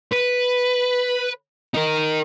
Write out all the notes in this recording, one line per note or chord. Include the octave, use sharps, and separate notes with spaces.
B4
D#4 A#4